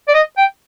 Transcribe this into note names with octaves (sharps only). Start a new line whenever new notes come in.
D5
D#5
G5